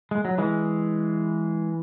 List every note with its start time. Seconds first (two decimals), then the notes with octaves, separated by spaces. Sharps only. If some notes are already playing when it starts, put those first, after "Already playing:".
0.11 G#3
0.25 F#3
0.38 E3 G#3